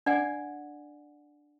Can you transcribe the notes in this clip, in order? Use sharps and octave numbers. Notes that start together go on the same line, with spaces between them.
D4 D5 F#5 G#5